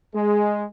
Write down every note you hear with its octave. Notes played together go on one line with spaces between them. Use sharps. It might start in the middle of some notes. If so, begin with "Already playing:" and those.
G#3